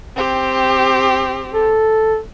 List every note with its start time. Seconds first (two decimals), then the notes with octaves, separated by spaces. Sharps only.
0.16 C4 G4
1.54 A4